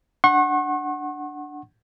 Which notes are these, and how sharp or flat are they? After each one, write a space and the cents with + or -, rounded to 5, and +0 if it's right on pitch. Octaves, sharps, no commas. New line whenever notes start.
D4 +0 F#5 +5 C#6 -40